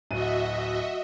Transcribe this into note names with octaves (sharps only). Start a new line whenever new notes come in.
D1 F#4 D#5 E5 D#7